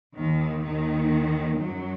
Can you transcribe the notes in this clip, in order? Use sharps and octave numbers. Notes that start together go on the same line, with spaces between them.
D#2 D#3
D#2 D#3
F#2 F#3